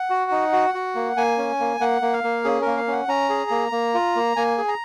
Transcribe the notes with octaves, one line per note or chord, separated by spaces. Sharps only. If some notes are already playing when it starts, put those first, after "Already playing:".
Already playing: F#5
F#4
D#4
F#4
F#4
A#3
A#3 G#5
C#4
A#3
A#3 F#5
A#3
F5
A#3
C#4 G#4
A#3 A#4
F5
C#4 F#5
C#4 A#5
G#4
A#3
A#3
F4
A#3
A#3 G#5
G#4
A#5